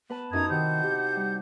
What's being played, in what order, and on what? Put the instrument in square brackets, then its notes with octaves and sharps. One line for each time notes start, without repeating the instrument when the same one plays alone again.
[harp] B3 B4 A5
[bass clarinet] F#2 [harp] D#4 E4 F#4 [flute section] A#5 D#6 G#6
[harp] C3 [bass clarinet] D#3 [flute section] F#5 G6
[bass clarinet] G4
[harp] G3